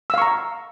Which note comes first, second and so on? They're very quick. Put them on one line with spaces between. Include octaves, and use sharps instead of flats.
E6 F5 C#6 A#5